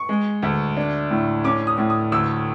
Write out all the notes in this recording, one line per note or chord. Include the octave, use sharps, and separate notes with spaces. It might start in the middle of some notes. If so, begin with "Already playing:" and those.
Already playing: C#6
G#3
D2
D4
A2
C#4 D6
D#6
A2
D#6
D2 E6